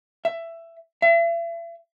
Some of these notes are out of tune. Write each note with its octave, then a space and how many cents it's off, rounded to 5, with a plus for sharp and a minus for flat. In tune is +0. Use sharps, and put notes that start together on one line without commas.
E5 +15
E5 +40